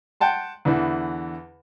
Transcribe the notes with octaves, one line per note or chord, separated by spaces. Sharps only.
F#5 G5 A5 C6
E2 D3 E3